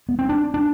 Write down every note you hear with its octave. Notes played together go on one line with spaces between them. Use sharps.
B3
C4
D4
D4